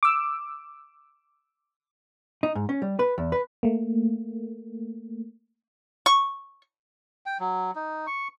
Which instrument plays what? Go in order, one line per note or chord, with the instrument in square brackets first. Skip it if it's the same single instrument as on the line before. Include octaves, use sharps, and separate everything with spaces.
[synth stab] D6 E6
[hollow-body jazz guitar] D#4
G#2
C#4
G3
B4
E2
B4
[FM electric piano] A3 A#3
[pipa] C#6
[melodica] G5
F#3
D#4
C#6